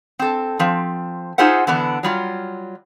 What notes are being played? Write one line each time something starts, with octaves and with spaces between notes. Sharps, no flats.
C4 A4
F3 C4
D#4 F4 G#4 C5 E5 F#5
D3 E3 B3 D4
F#3 G3 F4